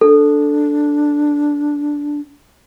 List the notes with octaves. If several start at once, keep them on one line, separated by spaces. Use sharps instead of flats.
D4 A4